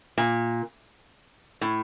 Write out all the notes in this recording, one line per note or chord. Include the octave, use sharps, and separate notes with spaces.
A#2
A2